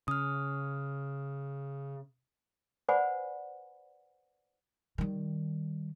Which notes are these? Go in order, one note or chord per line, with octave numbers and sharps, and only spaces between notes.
C#3 D#6 F6
B4 C5 D5 F#5 G#5 B5
D#3 G3